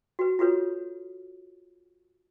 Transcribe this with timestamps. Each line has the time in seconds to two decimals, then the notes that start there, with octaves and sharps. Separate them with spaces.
0.19 F#4 B4
0.39 F4 F#4 A4 B4 C#5